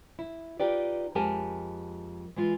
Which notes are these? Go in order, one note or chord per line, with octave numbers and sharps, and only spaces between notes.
E4
D#4 F4 G4 B4 D5
F2 G#3 G4 A#4 G#5 A5
E3 G#3 F4